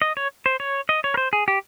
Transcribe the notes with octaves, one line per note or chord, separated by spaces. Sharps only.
D#5
C#5
C5
C#5
D#5
C#5
A#4
C5
G#4
G4